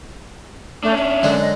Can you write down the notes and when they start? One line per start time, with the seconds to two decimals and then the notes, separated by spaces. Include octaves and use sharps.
0.83 A3 C#4 D4
0.98 E5
1.23 F#2 D3 G#3
1.41 D#5